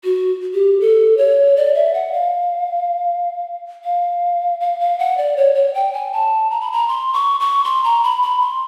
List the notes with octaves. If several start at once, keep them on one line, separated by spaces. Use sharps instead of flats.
F#4
G4
A4
C#5
D5
E5
F#5
F5
F5
F5
F5
F#5
D5
C#5
C#5
G5
G#5
A5
A#5
B5
A#5
C6
C#6
C#6
C6
A#5
B5
B5
C6